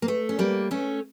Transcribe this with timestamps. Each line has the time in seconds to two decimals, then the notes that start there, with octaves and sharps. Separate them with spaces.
0.02 A#3
0.08 A3
0.29 C#4
0.39 G3 A#3
0.71 A3 C#4